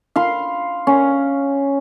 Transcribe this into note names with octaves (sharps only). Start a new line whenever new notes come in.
F5 B5 C6
C#4